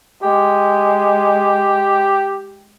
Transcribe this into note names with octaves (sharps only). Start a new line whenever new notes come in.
G#3 G4